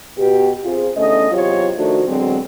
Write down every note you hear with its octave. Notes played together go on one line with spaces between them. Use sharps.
B2 G4
C3 F4 G#4
E2 D3 A3 C#4 D#5
E2 C3 F#3 F4 G4 C#5
D#3 F3 A3 D4 F#4
B2 D3 F#3 G#3 C4